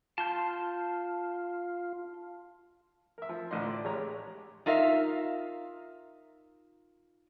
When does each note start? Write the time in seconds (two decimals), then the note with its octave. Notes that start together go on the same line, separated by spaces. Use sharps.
0.18 F4 A5 C6 G6
3.18 A#4 E5
3.29 F3
3.51 A1 A2 D3 D4 D#5 C6
3.69 D5
3.84 A1 A2 G#3 G4 C#5 A#5
4.66 D#4 F4 A#4 E5 F5